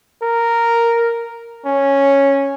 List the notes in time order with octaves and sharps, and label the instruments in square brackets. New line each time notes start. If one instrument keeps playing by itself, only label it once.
[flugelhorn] A#4
C#4